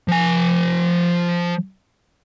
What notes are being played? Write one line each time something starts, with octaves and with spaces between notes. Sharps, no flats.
F3 G#5